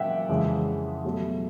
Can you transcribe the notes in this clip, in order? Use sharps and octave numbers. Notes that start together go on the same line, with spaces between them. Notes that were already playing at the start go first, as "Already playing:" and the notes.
Already playing: A#2 F#3 A#3 C#4 E5 F#5 G5
F2 C#3 E3 G#3
B2 F#3 A3